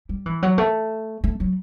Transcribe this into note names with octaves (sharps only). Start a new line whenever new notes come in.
G3
E3
F#3
A3
A3
F#3